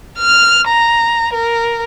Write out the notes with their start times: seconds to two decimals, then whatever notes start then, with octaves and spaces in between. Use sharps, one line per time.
0.19 F6
0.68 A#5
1.34 A#4